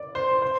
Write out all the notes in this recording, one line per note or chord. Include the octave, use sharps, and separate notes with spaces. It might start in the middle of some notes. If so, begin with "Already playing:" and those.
Already playing: D5
C5
C5